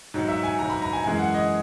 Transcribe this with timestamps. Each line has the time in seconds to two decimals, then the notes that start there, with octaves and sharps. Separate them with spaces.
0.14 G#2 F#3
0.28 E5
0.43 G#5
0.59 G#2 F#3 A#5
0.70 B5
0.82 A#5
0.93 G#5
1.04 F#2 E3 G#3 G#5
1.19 F#5
1.34 D#5